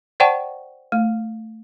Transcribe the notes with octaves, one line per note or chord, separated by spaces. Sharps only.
C5 D5 F#5 G5 A5 C#6
A3